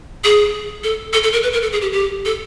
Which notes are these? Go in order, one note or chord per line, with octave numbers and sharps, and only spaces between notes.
G#4
A4
A4
A4
A#4
B4
A#4
A4
G#4
G4
G4
A4